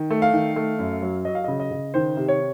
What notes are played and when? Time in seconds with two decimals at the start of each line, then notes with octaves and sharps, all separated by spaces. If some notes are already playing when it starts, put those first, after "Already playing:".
Already playing: D#3
0.10 A3
0.22 F5
0.33 D#3
0.56 A3
0.79 F#2
1.02 F#3
1.25 F#3 D#5
1.35 F5
1.44 C#3 D#5
1.60 D#5
1.71 C#3
1.94 D#3 C5
2.17 C3
2.28 C#5